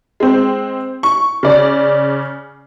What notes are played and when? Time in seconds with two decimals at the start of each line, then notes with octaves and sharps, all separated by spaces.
0.20 G#3 C4
1.03 C#6
1.43 C#3 D5